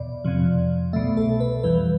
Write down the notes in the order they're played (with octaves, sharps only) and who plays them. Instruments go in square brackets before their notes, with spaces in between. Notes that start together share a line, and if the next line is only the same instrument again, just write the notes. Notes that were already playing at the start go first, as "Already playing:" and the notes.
Already playing: [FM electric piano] E2 B2 D5
F2 C3 F3
C2 B2 A3 E5
A4
B4
F2 E3 G3 B4